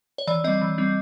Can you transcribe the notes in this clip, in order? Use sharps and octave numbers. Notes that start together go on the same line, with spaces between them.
C#5
E3 D5
G3 C4 D#5
E3
G3 C4